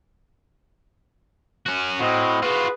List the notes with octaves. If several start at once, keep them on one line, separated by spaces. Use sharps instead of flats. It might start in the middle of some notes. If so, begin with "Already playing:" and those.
C#4 F#4
A2 C4 F#4 D#5
F4 F#4 G#4 B4